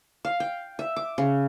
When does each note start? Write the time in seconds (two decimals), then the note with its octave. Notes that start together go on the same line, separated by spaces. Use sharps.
0.25 F5
0.40 G5
0.79 E5
0.96 D6
1.18 C#3